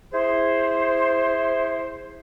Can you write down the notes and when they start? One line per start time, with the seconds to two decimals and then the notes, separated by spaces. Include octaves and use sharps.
0.12 E4 G#4 C5